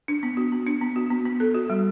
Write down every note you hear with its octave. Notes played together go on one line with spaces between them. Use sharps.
D4
B3
F#4
B3
D4
B3
F#4
B3
B3
A4
F#4
G3